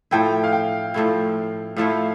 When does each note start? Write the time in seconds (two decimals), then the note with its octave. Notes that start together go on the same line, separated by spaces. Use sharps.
0.11 A2 F3 A3 E4 G5
0.44 F5
0.53 G5
0.94 A2 F3 A3 E4
1.77 A2 F3 A3 E4 F5